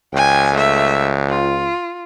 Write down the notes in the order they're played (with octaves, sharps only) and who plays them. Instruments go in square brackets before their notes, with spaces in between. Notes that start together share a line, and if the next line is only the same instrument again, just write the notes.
[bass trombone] C#2 [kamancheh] G5 G#5
[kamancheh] A3 E5
F4